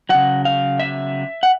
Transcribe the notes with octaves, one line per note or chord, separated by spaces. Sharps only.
C#3 F#3 F#5
F5
E5
F#5